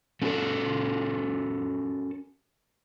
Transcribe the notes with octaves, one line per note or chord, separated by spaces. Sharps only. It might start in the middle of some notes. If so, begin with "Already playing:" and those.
A3 C#4 F#4 G4 A4 A#4